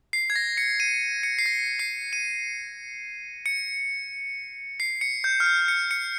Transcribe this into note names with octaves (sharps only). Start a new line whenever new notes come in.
C7
G#6
A#6
C#7
D#7
C#7
C7
A#6
C7
D#7
C#7
C7
C#7
G6
F6
G6
C#7
C#7